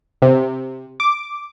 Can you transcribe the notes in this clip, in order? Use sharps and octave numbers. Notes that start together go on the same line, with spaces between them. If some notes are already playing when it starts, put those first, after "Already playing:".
C3
D6